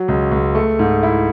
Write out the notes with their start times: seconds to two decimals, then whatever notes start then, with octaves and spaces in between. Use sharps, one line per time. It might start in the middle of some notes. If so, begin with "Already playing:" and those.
Already playing: F#3
0.08 C#2
0.32 C#2
0.55 A3
0.79 G#2
1.03 E4